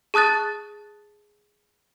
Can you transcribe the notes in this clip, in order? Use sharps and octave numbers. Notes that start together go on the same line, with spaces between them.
G#4 A5 D#6 F#6 A6